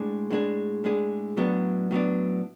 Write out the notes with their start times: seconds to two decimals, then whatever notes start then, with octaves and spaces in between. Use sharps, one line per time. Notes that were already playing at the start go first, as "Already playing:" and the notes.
Already playing: A2 G#3 D4 G#4
0.30 A2 G#3 D4 G#4
0.84 A2 G#3 D4 G#4
1.37 A2 F#3 B3 D4
1.91 A2 F#3 B3 D4